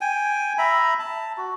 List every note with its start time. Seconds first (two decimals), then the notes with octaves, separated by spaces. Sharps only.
0.01 G5 G#5
0.58 E5 A#5 B5
0.99 A5
1.37 F#4